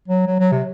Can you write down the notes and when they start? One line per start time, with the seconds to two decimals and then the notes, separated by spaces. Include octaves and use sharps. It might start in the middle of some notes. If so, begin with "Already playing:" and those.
0.08 F#3
0.27 F#3
0.39 F#3
0.52 C3